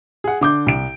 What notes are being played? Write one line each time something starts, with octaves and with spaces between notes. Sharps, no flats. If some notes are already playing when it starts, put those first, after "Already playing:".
G#4 F#5
D3 D6 G6
C2 D7